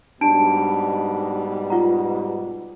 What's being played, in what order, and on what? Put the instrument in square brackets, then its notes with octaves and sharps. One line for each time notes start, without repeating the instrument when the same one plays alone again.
[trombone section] G#2 B2 G3 [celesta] D4 A5 D7
[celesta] F4 F#5 A#5